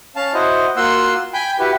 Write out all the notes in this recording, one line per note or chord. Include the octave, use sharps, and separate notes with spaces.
C#4 F5 A5
E4 F#4 C5 D#5
A#3 F4 F#4 F#5 C6 E6
G5 G#5 B5 G6
E4 F#4 G4 B4